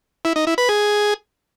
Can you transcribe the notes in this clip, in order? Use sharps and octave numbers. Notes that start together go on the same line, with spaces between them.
E4
D#4
E4
B4
G#4